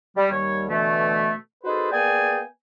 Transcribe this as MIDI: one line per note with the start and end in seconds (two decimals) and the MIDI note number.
0.17 0.27 55
0.31 0.64 39
0.31 0.64 55
0.31 0.64 73
0.68 1.32 47
0.68 1.32 50
0.68 1.32 52
0.68 1.32 57
1.64 1.89 63
1.64 1.89 66
1.64 1.89 68
1.64 1.89 69
1.64 1.89 71
1.64 1.89 72
1.91 2.41 58
1.91 2.41 59
1.91 2.41 68
1.91 2.41 74
1.91 2.41 79
1.91 2.41 80